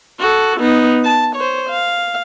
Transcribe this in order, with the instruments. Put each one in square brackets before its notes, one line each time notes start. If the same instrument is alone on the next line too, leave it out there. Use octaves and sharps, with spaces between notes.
[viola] F#4 A4
B3 D#4
A5
C5 C#5
F5